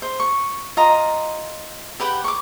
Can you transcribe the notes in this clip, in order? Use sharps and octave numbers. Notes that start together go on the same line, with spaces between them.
C5
C#6
F4 D#5 A#5
G4 B4 F#5 G5
C#6 D6